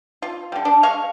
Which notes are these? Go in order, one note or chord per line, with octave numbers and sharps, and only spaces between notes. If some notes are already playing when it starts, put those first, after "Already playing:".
F4
D3 G3
D4
G#3 F5 C#6